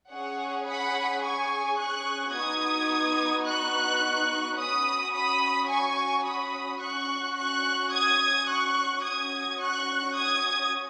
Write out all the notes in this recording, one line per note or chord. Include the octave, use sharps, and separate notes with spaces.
C#4 G#4 C#5 F#5
F#5 B5
G#5 C#6
C#6 F#6
B3 D#4 F#4 D#6 G#6
C#6 F#6
C#4 F#4 B5 D#6
B5 D#6
G#5 C#6
B5 D#6
C#4 F#4 C#6 F#6
C#6 F#6
D#6 G#6
C#6 F#6
C#4 F#4 D#6 G#6
C#6 F#6
D#6 G#6